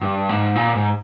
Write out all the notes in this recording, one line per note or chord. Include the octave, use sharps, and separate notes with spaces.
G2
G#2
A#2
G#2